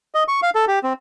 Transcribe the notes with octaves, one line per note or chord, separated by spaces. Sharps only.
D#5
C#6
F5
A4
G4
C4